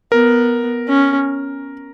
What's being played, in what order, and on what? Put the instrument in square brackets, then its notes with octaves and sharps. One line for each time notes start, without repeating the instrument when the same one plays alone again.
[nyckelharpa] B3 [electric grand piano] A#4
[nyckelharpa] C#4